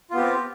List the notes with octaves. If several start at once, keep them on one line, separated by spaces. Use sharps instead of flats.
B3 C4 F4 G4